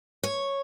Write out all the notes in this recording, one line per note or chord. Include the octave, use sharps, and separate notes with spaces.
C#5